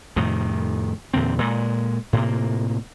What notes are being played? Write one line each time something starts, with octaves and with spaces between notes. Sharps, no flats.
F2 A2 C3 D#3
E2 A#2 D3 C4
A#2 G#3
A2 C3 A#3